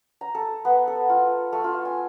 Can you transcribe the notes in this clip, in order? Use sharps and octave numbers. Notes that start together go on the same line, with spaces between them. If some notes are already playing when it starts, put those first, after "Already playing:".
A#5
A4
B3
A4
F4
A3
F4
G#5